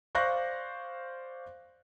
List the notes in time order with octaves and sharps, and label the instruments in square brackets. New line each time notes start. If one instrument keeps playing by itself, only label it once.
[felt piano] C5 D5 F5 C#6 F#6 A#6